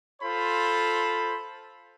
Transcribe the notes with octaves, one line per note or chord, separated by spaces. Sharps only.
F4 A4 C5 B5